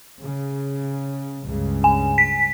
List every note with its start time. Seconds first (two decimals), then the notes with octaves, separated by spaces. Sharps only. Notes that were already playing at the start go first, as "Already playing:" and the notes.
0.21 C#3
1.46 C#2 G2 C#3
1.84 G#5
2.18 B6